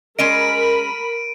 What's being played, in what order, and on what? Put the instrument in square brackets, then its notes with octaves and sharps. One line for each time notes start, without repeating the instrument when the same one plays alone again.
[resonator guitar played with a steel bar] G#3 C#4 D#5 [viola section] A#4 B5 [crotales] D7 D#7